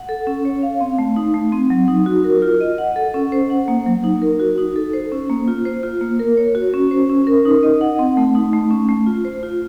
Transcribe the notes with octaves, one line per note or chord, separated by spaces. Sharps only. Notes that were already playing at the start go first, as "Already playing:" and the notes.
Already playing: F#5
A4
C#4
C#5
F5
C4
A3
D#4
A3
C4
F#3
D#4
F#4
A#4
F4
D#5
F#5
A4
C#4
C5
F#5
A#3
F#3
D#4
A#4
F#4
D#4
A4
C5
C#4
A#3
F4
C5
F4
A#3
A#4
C#5
F#4
C#4
C5
C#4
A#4
D#4
D#5
F#5
C4
A3
D#4
A3
C#4
A3
F4
C5
F4